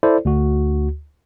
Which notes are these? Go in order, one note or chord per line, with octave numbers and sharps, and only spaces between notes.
E4 A4 C5 D5
D2 F#4